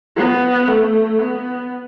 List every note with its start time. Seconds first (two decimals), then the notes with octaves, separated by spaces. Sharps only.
0.17 B3
0.68 A3
1.18 B3